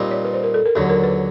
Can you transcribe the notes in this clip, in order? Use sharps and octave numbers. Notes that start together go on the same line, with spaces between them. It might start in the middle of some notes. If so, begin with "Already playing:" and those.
Already playing: A#2 G3 C4 D#4
C#5
B4
C5
A#4
A4
A#4
D#2 D3 F#3 A4
A#4
B4